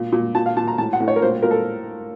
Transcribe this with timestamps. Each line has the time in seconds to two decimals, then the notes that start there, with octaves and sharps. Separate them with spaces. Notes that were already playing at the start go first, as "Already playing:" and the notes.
Already playing: A#2
0.12 A#2
0.35 A#2 A5
0.46 F5
0.57 A#2 A5
0.68 A#5
0.78 A2 A5
0.93 F#5
1.00 A2
1.08 C#5
1.16 A#4
1.22 A#2 C5
1.43 A#2 A#4
1.51 A4